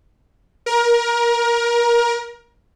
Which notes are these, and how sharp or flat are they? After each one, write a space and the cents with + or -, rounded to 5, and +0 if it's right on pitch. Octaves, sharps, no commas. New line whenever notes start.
A#4 +25